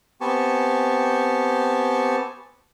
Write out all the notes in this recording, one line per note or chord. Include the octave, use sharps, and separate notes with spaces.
B3 C4 G4 G#5 A5 C#6